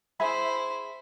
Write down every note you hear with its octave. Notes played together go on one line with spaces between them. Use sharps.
E4 G#4 C5 E5 B5